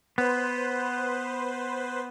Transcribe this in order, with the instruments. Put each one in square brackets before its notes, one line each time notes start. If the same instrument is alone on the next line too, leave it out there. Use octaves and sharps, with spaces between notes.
[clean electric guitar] B3 [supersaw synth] B4 C5